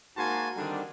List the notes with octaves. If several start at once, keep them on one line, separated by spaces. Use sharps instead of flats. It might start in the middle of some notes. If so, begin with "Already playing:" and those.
G#2 A#3 F#4 G#5 A5 C6
D3 D#3 G3 C4 D4